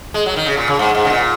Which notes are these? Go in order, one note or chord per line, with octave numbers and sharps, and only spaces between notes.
G#3
F#3
D#3
C#3
A#2
C#3
G#2
G#2
C#3
A#2